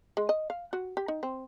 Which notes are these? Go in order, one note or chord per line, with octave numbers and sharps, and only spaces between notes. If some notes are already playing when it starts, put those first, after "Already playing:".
G#3
D#5
F5
F#4
G4
D#4
C4